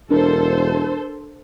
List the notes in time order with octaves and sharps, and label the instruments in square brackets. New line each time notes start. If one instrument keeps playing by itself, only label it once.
[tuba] E1 [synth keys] D4 A#4 [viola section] A4 C5